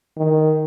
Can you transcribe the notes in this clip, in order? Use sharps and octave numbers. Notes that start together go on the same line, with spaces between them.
D#3